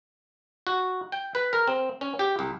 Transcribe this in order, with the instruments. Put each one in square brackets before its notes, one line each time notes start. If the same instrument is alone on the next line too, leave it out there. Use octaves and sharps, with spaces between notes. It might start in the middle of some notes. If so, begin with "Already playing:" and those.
[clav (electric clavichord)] F#4
G5
B4
A#4
C4
C#4
G4
C2